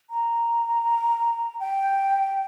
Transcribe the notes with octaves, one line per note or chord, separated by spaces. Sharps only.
A#5
G5